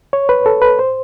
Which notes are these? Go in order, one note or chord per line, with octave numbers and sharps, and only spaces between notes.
C#5
B4
A4
B4
C5